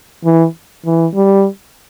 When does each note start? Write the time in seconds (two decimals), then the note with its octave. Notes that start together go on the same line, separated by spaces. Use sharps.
0.25 E3
0.85 E3
1.15 G3